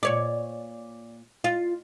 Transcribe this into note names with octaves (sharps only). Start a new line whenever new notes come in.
A#2 C#5 D5
F4